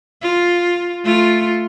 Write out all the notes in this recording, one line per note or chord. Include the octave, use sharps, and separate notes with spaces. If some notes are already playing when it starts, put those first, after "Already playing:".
F4
A3 F4